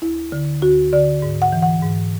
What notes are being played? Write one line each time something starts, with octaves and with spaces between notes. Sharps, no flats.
D2 E4
D3
D2 F#4
D3 D5
G#2
F#5
E3
F#5
G#2